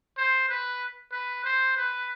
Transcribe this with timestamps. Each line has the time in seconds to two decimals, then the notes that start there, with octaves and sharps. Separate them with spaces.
0.17 C5
0.49 B4
1.12 B4
1.44 C5
1.77 B4